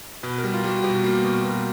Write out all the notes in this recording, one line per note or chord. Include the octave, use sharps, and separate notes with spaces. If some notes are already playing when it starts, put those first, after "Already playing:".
B2 B4
A#4
G3
F4
G3 F#4
B2 G4
F#4
A#3
B2
B2